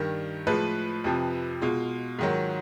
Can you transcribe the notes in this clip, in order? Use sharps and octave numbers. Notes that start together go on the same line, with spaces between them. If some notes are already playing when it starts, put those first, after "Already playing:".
Already playing: G2 D#3 G3
A2 F3 G#3 B4
F2 C3 F3
B2 G#3 F4
G#2 D#3 F#3